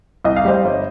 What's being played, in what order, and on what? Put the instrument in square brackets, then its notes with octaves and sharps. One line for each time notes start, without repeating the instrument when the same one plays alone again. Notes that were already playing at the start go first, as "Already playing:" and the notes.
[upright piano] C2 D#5
F5
G3 C5 D#5
G1